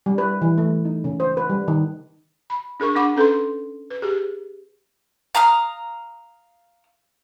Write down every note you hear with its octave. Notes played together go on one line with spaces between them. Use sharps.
G3
B4
E3
A3
D#4
C#3
C5
B4
G3
D#3
B5
D4 G#4 A#4 C#6
D4 F#5 B5 D6
C#4 A4 B4 C6
B4
G4 G#4
F5 A#5 D#6 F6